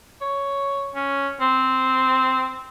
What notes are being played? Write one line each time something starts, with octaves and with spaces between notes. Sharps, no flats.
C#5
C#4
C4